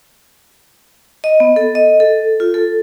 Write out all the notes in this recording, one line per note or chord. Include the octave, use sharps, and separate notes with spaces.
D#5
B3
A4
D#5
A4
F4
A4